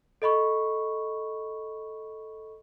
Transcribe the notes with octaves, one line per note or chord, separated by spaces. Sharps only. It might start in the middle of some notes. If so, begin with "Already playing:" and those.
A4 D#5 B5 C#6